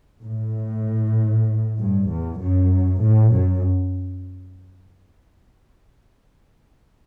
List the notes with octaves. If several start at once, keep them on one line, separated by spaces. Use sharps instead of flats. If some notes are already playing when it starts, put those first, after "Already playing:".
A2
G2
E2
F#2
A2
F#2